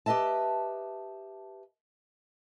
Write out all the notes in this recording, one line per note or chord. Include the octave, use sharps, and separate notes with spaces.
G4 B4 D#5 E5 A5